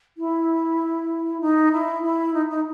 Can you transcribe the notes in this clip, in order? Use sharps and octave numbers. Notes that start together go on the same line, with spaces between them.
E4
D#4
E4
E4
D#4
D#4